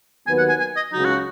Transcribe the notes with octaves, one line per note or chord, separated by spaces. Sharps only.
D#2 D#3 F#3 B3 G#5
F#5
G#5
G#5
D#5
C#2 C#3 F#3 D#4
F#4